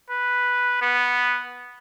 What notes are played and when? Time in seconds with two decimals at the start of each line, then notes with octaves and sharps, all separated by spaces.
0.10 B4
0.82 B3